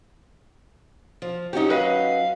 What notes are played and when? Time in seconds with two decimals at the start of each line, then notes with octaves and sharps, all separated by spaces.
1.22 F3
1.53 F#3 C#4 D#4 F#4 G4
1.70 B4 D#5 F5